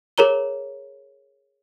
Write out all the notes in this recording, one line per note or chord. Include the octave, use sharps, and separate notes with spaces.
G#4 A#4 C#5 A#5 G7